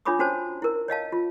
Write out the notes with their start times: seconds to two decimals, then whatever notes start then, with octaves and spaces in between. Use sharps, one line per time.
0.05 D4 F4 C#5 B5 D6 D#6
0.19 C#4 D4 F#4 C5 C#5 A5
0.62 E4 A#4
0.88 C#5 D#5 F5 A5
1.12 F4